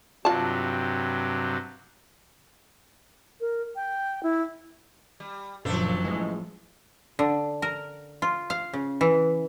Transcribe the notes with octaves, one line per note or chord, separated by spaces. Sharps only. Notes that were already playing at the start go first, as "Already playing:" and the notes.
G2 C3 F#3 F4 A5
A#4
G5
E4
G3
F#1 A#2 D#3 F3 F#3 D4 A4
A1 A2 G#3
D3
A#4
F4
F5
C#3
E3